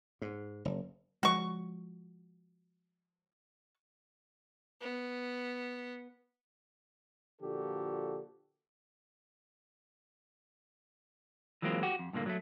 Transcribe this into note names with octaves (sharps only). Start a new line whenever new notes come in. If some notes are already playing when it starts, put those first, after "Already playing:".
G#2
F#1
F3 G#3 F#4 C#6
B3
A#2 D3 F3 F#4 G4 A4
E3 F#3 G#3 A#3 C4 F4
F#4 G4
F2
G2 A#2 D3 A#3
F#3 G3 A3